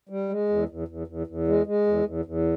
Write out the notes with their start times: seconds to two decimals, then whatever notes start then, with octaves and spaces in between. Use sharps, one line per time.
0.09 G3
0.29 G#3
0.49 E2
0.69 E2
0.88 E2
1.07 E2
1.27 E2
1.47 G#3
1.66 G#3
1.87 E2
2.05 E2
2.25 E2